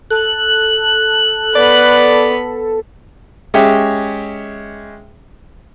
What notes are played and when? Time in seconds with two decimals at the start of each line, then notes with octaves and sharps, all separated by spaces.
0.10 A4 F#6
1.55 B3 D5 B5
3.54 G#3 C#4 G4 C#5 E5 G5